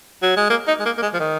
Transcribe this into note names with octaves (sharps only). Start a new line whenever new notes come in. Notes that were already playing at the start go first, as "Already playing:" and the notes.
F#3
G#3
A#3
D#4
G#3
A#3
A#3
G#3
F3
D#3